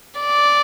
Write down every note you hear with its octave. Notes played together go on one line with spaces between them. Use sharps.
D5